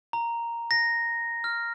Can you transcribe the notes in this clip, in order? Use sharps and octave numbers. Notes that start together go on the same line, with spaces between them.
A#5
A#6
F6